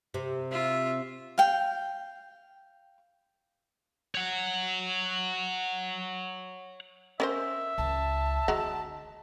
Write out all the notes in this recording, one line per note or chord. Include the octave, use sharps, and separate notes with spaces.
C3
F4 E5
F5 G5
C#5 F#5
C#4 A#4 C5 E5
C#2 A5
D3 G#3 F#4 A#5